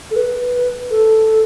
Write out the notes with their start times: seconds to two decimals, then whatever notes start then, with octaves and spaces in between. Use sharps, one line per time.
0.11 A4
0.16 B4
0.90 A4